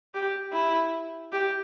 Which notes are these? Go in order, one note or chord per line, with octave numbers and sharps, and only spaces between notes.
G4
E4
G4